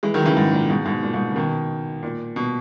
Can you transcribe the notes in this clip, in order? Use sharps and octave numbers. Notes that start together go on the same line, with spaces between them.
E3 G#3
D#3 F#3
C#3 E3
G#2
A#2
G#2 B2
G#2 B2
A#2
G#2 B2
C#3
B2 D#3
A#2
B2